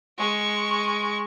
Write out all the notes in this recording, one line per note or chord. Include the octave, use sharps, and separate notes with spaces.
G#3 C#6